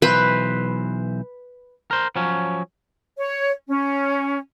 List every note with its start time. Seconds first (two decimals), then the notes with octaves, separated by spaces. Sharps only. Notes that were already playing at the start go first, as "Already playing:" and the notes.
0.02 B1 E3 B4 C5
1.91 A#4 C5
2.16 F3 F#3 C#4
3.17 C#5
3.68 C#4